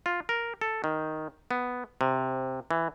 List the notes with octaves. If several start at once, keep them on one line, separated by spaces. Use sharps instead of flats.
F4
A#4
A4
D#3
B3
C3
E3